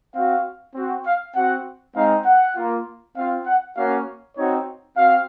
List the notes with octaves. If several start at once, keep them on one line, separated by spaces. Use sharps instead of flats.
C4 F#4 F5
C4 F#4
F5
C4 F#4 F#5
G#3 C4 D#4 F5
F#5
A#3 F4
C4 F4 F5
F#5
A#3 C#4 F#4 F5
C4 D#4 F#4 C#5
C4 F#4 F5